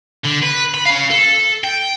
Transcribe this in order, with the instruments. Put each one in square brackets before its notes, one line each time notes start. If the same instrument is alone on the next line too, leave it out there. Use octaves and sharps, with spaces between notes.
[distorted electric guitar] D3
B4
B5
C#4 F5
A4
G5